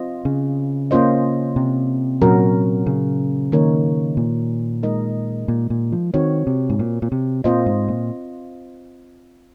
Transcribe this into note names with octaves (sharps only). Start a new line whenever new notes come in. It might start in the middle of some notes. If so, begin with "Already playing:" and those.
Already playing: C4 F4 C5 D#5
C#3
A#3 C#4 F4 C5 D#5
C3
A#2 F#3 C#4 F#4 A#4
C#3
D#3 A#3 D#4 A#4 C#5
A#2
G#3 D#4 A#4 D#5
A#2
A#2
F3
D#3 C4 F#4 C#5
C3
G#2
A#2
A#2
C3
A#2 C4 F4 C5 D#5
G#2
A#2